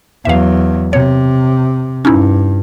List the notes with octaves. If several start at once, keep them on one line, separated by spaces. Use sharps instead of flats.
E2 F#3 E5 F5
C3 C#5
G2 C#4 D#4 E4